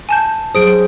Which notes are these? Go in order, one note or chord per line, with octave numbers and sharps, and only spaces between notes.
G#5 A5 G6
F#3 G#4 C5 D#6 D7